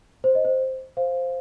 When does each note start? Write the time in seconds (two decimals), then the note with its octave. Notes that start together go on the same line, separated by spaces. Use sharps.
0.24 C5
0.35 D#5
0.45 C5
0.97 C5 F5